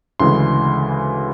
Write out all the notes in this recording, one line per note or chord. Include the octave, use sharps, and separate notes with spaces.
D2 C#3 E3 G#3 C6